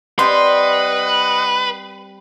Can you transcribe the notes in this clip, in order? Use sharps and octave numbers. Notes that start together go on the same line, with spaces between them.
G3 C4 B4 D#5 F#5 C6